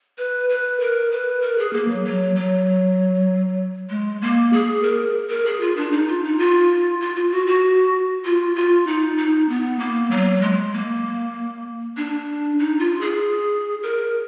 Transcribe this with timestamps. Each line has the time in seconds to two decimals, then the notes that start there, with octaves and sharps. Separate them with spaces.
0.18 B4
0.50 B4
0.80 A#4
1.12 B4
1.42 A#4
1.58 G#4
1.73 A#3
1.88 F#3
2.05 F#3
2.36 F#3
3.90 G#3
4.22 A#3
4.53 G#4
4.83 A#4
5.30 A#4
5.46 G#4
5.61 F4
5.76 D4
5.92 D#4
6.08 F4
6.24 D#4
6.39 F4
7.01 F4
7.16 F4
7.31 F#4
7.47 F#4
8.25 F4
8.56 F4
8.87 D#4
9.17 D#4
9.49 B3
9.79 A#3
10.11 F#3
10.42 G#3
10.73 A#3
11.97 D4
12.59 D#4
12.79 F4
13.01 G#4
13.83 A#4